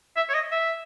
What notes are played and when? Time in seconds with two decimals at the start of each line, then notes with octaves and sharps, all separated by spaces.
0.16 E5
0.29 C#5
0.35 D#5
0.51 E5